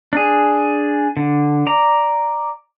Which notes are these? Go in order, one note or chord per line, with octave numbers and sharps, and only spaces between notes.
D4 G#4
D3
D5 A#5